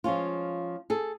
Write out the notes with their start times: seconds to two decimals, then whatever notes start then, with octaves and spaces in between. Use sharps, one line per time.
0.04 F3 G#3 C#4 F4
0.90 G#4 A4